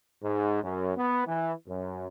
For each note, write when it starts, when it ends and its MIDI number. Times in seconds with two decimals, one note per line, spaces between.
0.23 0.58 44
0.62 0.91 42
0.96 1.22 59
1.26 1.52 52
1.66 2.07 42